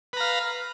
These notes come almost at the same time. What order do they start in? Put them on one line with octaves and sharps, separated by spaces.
B4 A#5 F5